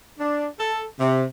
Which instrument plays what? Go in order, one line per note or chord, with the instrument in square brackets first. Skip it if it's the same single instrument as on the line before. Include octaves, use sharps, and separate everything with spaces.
[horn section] D4
A4
C3